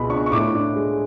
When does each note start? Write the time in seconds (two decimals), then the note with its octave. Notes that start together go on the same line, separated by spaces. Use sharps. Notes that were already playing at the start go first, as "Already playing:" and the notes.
Already playing: C#2 B2 G#3 B5
0.10 D4 C#6
0.26 C#6
0.32 A2 D6
0.54 D4
0.76 G#3